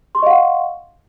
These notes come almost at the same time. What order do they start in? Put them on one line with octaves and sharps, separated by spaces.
C6 C#6 D#5 F5 F#5